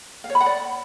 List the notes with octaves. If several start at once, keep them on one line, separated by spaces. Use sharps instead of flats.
F5
C#5
B5
F#5
D5